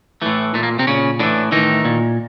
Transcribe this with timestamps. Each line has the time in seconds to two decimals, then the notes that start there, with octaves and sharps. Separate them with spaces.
0.22 A2 E3 A3
0.54 A#2 A3
0.63 A#3
0.79 C3 C4
0.87 A#2 C#3 C#4
1.19 A2 D3 E3 D4
1.52 A2 D#3 E3 D#4
1.85 A#2